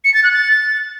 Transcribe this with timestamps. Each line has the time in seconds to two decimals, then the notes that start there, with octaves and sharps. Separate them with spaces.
0.04 C#7
0.14 A6
0.24 F#6
0.33 A6